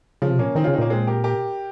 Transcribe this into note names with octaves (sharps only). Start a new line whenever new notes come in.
C#3 F3
C3
A#2 A#3 C#4
D#3 C4 D#4
C#4 F4
C#3
C4 D#4
A#2 A#3 C#4
G#3 C4
G4 A#4
G4 A#4